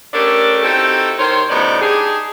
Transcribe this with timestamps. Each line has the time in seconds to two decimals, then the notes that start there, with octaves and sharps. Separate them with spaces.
0.14 A3 C#4 D4 G4 A4 A#4
0.63 C4 D#4 E4 F#4 G4 A4
1.19 D#3 C5 C#5
1.50 F#2 A2 C3 B3 D#4 D5
1.80 D4 D#4 G4 G#4